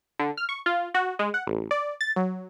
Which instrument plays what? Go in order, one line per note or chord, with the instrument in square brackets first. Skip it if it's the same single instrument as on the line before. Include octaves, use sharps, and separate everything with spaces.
[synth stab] D3
F6
C#6
F4
F#4
G#3
F#5
A1
D5
A6
F#3